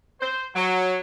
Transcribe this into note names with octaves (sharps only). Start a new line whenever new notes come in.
C5
F#3